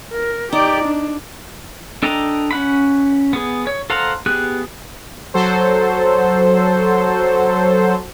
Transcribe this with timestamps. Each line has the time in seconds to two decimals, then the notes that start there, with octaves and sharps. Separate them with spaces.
0.13 A#4
0.53 D#4 G4 D5
0.85 D4
2.03 D4 A4 D#5 G5 A#5
2.51 C#4 F#5 B5
3.33 B3 G#4
3.67 C#5
3.90 A4 C5 F5 F#5 A#5
4.26 B3 G4 G#4 F#6
5.34 F#3 A4 C5